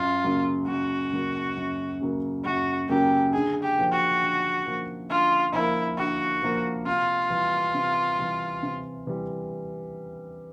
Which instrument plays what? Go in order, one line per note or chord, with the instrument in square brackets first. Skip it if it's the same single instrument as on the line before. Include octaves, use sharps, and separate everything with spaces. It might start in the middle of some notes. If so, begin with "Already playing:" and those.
Already playing: [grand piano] F#2 [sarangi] F4
[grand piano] C#3 F#3 A#3
[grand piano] F#2 [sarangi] F#4
[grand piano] C#3 F#3 A#3
F#2
C#3 F#3 A#3
[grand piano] F#2 [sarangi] F#4
[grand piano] C#3 F#3 A#3 [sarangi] G4
[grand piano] D3 [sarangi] G#4
[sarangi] G4
[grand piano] F3 A#3
[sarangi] F#4
[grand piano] D3
F3 A#3
[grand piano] D3 [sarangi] F4
[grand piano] F3 A#3 [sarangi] E4
[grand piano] D3 [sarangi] F#4
[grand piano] F3 A#3
[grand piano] C3 [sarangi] F4
[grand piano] E3 G3
C3
E3 G3
C3
E3 G3